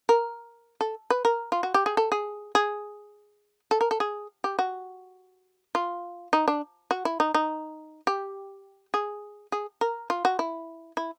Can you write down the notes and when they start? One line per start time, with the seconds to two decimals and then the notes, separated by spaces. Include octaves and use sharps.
0.09 A#4
0.81 A4
1.10 B4
1.25 A#4
1.52 F4
1.63 F#4
1.74 G4
1.86 G#4
1.97 A4
2.12 G#4
2.55 G#4
3.71 A4
3.81 A#4
3.91 A4
4.00 G#4
4.44 G4
4.59 F#4
5.75 F4
6.33 D#4
6.48 D4
6.91 F#4
7.05 E4
7.20 D#4
7.34 D#4
8.07 G4
8.94 G#4
9.52 G#4
9.81 A#4
10.10 F4
10.25 F#4
10.39 E4
10.97 E4